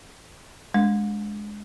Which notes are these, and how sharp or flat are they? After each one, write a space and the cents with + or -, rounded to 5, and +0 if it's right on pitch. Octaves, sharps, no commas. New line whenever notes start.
G#3 +5 D4 -25